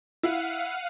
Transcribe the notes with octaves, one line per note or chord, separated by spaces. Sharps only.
E4 F5 F#5 D#7